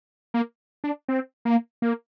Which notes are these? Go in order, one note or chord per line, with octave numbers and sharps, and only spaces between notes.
A#3
D4
C4
A#3
A#3